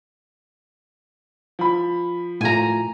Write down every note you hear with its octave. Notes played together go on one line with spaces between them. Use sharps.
F3 B5
A2 F4 G#5 A#5